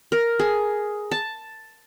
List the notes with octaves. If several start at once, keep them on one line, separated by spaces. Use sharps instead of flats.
A#4
G#4
A5